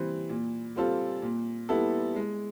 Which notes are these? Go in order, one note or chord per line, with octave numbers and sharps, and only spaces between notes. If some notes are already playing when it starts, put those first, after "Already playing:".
Already playing: E3 G3 C4
A#2
G3 C4 F4 A4
A#2
G3 B3 E4 A4
G#3